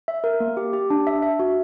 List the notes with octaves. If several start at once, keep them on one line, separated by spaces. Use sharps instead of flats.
E5
A#4
A#3
G4
G4
D4
E5
E5
F#4